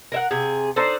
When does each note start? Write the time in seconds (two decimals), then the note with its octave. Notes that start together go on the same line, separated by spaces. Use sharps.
0.12 A#4 E5 F#5
0.31 C3 G#4
0.76 D4 D#4 A4 C5